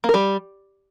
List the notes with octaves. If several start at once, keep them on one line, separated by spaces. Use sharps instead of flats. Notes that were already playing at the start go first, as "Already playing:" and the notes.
A#3
A#4
G3